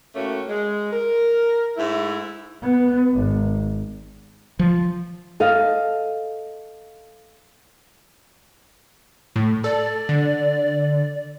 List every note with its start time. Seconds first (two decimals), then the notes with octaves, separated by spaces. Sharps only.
0.15 A2 A3 A#3 C#4 F#4
0.49 G#3
0.91 A#4
1.77 G#2 A3 E4
2.62 B3
3.14 G#1
4.59 F3
5.40 A4 D#5 F5
9.36 A2
9.64 A4 D5
10.09 D3